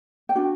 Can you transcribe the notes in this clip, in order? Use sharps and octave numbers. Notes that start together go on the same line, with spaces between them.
G5
D4 F#4